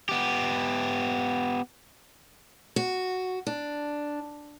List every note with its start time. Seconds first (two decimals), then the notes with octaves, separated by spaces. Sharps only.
0.09 B3 G4
2.76 F#4
3.47 D4